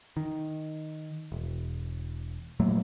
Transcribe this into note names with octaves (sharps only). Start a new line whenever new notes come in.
D#3
E1
A#2 F#3 A3 A#3